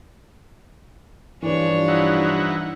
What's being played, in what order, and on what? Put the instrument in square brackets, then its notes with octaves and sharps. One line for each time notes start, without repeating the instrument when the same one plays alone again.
[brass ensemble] G2 F3 [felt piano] E3 B4 [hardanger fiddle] D4 C#5
[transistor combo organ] D#4 E4 F#5